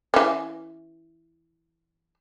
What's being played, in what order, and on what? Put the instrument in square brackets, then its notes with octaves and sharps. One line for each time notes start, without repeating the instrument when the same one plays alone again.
[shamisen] E3 C#4